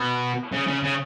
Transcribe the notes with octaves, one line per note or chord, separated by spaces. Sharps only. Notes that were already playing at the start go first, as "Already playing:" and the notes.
Already playing: B2
C#3
C#3
C#3